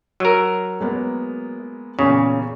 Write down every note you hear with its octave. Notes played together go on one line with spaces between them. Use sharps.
F#3 A#4 E6
G#3 A#3 B3
E2 A#2 C#3